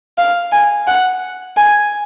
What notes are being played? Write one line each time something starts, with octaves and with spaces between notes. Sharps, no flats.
F5
G#5
F#5
G#5